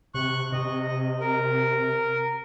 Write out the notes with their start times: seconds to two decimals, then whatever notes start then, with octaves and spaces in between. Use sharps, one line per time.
0.14 C3 C#6 F#6
0.52 C3 D#5
1.20 A#4